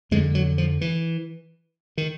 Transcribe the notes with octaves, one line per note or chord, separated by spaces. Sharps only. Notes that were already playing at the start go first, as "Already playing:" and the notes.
F2 D3 G#3
F#3
F3
E3
D#3